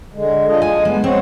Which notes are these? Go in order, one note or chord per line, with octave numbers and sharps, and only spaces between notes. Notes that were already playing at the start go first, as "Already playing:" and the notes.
D3 G#3
D4 F4 D#5
G#3 G#5
G#3 B3
C4 C5 C#5 F#5